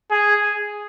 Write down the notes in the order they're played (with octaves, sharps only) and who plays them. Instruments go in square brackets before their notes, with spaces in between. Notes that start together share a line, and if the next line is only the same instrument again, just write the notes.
[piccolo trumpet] G#4